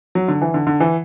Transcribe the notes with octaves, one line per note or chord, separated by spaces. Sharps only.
F#3
D3
E3
D3
D3
E3